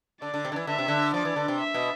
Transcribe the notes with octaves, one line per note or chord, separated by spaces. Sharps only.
D3 D5
D3
C3
D3
E3
D3 E5
C3
D3
F3 D5
E3
D3
C3
E5
B2